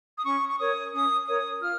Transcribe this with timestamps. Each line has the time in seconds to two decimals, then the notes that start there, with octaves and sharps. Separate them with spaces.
0.17 D#6
0.25 C#4 C#6
0.49 C#6
0.59 A#4 C#5 D#6
0.93 C#4 D#6
1.27 A#4 C#5 D#6
1.60 F4 F6